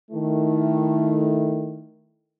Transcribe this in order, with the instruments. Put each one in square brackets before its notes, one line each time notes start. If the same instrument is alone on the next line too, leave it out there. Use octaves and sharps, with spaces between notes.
[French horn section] D#3 A3 E4